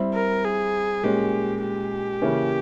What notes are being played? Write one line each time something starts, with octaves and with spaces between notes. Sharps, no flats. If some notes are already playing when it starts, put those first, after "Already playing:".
Already playing: G3 C4 E4
A#4
G#4
A#2 G#3 C#4 G4
G4
C#3 E3 A#3 C#4